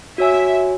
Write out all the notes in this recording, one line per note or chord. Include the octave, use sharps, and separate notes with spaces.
F#4 C#5 E5 G#5